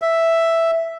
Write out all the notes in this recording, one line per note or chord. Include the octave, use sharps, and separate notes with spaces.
E5